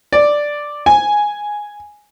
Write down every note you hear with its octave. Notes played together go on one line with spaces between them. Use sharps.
D5
G#5